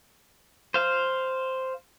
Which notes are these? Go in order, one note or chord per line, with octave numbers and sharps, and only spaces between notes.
C5 F5